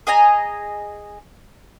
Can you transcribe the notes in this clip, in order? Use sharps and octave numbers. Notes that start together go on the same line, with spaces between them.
G#4 D#5 G#5 A#5